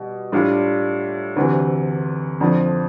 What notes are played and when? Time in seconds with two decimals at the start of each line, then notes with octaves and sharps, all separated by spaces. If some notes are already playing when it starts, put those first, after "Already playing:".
Already playing: B2 G3
0.32 A2 G3 D4 F4
1.36 D2 C3 E3
2.40 F2 D3 F3